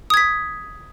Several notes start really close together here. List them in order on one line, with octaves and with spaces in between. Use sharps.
D#6 G#6 B6